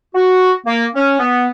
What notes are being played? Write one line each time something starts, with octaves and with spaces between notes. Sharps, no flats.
F#4
A#3
C#4
B3